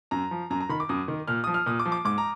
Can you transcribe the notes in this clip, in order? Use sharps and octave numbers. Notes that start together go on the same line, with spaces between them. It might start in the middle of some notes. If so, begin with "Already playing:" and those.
F#2 A#5
F3
F#2 A#5
A#5
D#3 B5
D6
F#2 D#6
D#3
A#2 F6
F3 D#6
F6
A#2 D#6
D6
F3
D6
G#2 D6
A#5